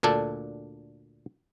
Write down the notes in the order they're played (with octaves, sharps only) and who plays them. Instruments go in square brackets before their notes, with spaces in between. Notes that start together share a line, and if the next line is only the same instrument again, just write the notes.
[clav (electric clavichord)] D2 A#2 D4 A4